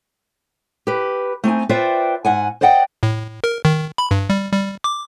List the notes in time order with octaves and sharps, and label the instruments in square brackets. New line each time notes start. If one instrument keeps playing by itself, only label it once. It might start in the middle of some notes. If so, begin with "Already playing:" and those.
[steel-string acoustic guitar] G4 B4
A3 C4 D#4 G#5
F4 B4 C5 D5 E5 G5
G#2 F#5 G#5
C5 D5 D#5 F#5 G5
[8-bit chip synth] A2
A#4
D#3
B5
G2
G3
G3
D6